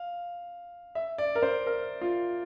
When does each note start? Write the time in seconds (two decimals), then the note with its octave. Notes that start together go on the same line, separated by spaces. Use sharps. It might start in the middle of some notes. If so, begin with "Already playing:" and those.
Already playing: F5
0.95 E5
1.18 D5
1.35 A#4
1.43 C5
1.66 A#4
2.01 F4